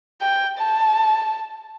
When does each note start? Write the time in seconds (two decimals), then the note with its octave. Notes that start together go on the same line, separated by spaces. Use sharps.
0.21 G5
0.58 A5